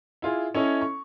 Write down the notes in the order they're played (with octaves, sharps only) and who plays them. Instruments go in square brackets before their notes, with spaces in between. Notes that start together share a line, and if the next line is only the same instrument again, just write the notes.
[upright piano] E4 F4 G#4
C#4 E4 A4 C#5 D#5
C#6